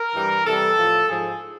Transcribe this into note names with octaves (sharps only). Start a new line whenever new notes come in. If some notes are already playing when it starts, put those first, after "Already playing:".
Already playing: A#4
G2 E3 G3
C3 E3 G3 A4
A2 F3
G#2 F3 G#4